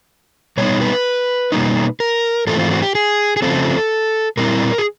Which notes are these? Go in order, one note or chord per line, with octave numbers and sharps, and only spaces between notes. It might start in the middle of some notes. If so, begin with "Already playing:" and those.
B2 G3 B3 D#4 C#5
B4
B2 G3 A#3 D#4
A#4
G#2 E3 A3 C4 F4 A4
F4
F#4
G4
G#4
G#4
C#3 F3 A3 C4 A4
A#2 G3 C4 E4 A#4
G#4